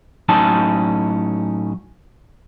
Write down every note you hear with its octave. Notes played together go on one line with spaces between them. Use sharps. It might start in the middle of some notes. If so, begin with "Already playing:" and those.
A2 F#3 C#4 D#4 A5